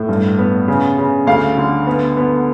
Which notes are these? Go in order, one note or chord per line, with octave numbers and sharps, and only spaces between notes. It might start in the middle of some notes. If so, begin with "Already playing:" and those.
Already playing: A2
G2
B3
C#3
C#3
D2 F5
D3
B3
B3